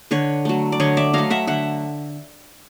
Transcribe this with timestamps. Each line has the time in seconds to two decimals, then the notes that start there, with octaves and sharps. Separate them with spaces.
0.11 D3 B4 C#5
0.45 F#3 A3
0.72 D5
0.80 D3 C#5 D#5
0.97 D5 E5
1.13 F#3 A3 D#5 F5
1.30 E5 F#5
1.47 D3 E5 F#5